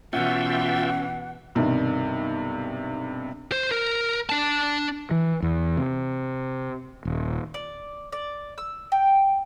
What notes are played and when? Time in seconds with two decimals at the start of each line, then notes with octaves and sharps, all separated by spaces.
0.13 B2 E3 C#4 F4 E5 F#5 G5
1.55 B1 G2 C3 D#3
3.52 C5
3.72 A#4
4.30 D4 A5
5.11 E3
5.42 E2
5.77 C3
7.05 D#1
7.54 D5
8.12 D5
8.58 E6
8.92 G5